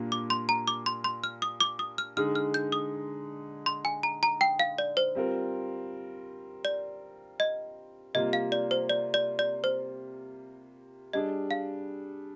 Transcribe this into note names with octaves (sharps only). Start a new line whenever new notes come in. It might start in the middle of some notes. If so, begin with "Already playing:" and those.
Already playing: A#2 G3 A#3 D4 F4
D6
C6
A#5
D6
C6
C6
F6
D#6
D6
D#6
F6
D3 G#3 D#4 G#4 F6
F6
G6
D#6
C6
G#5
A#5
A#5
G5
F5
D5
C5
G3 C4 F4 A#4
D5
D#5
C3 G3 A#3 F4 D#5
F5
D5
C5
D5
D5
D5
C5
G3 D4 G#4 D#5
F5